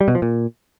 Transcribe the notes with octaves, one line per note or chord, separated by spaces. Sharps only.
G3
B2
F3
A#2